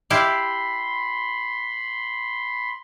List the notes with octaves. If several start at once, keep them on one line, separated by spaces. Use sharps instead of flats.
E4 G4 F5 B5 C6